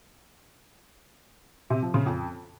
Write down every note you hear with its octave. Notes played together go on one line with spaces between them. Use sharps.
C3
F3
C#3
F2